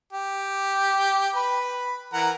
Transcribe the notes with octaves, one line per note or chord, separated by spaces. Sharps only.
G4
B4 B5
E3 A#4 F#5